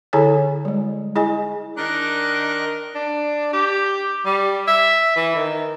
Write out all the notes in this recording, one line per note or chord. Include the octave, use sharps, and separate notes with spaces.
D3 E4 G#4 A4 C#5 G#5
G3 G#3
E4 G#4 D#5 G#5
D#3 D4 A#4 D#5 F#6
D4
G4
G3
E5
E3
D#3